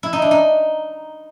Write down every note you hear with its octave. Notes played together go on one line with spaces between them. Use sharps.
E4
D#4
D4
D#4